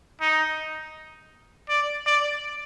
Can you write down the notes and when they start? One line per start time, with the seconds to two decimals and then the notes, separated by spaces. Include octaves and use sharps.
0.21 D#4
1.69 D5
2.06 D5